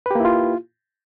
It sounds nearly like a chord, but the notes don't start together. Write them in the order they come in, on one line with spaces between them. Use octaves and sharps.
B4 G4 A#3 E4 F4